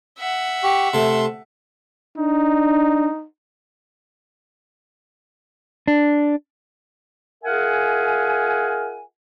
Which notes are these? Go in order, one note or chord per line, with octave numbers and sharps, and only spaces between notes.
E5 F#5
G4 C#6
C3 A3 C6
D4 D#4
D4
F4 G#4 A#4 E5 F#5 G#5